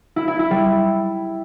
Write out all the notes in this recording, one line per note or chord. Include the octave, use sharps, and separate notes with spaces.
E4
E4
E4
G3